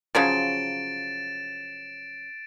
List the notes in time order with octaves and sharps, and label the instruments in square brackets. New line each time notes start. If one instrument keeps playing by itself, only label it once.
[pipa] C#3 F3 F#3 [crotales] A6 D7 E7